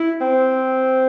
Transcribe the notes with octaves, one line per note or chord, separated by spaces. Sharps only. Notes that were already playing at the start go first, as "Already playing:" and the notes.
Already playing: E4
C4